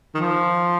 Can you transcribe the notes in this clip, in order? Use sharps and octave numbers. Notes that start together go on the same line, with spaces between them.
D#3
F3